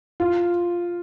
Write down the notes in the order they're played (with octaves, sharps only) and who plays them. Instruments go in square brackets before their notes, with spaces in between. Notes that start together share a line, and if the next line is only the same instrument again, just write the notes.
[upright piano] F4